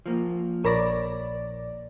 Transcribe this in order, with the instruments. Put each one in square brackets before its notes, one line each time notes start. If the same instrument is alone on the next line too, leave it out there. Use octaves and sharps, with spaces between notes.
[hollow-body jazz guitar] F3 A#3
[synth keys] A#1 D5 [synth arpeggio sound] A#4 B5 A#6 [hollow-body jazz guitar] C#5